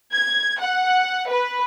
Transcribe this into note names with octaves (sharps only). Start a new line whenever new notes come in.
G#6
F#5
B4